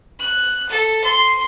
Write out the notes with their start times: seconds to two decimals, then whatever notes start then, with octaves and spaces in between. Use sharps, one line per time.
0.20 F#6
0.69 A4
1.04 C6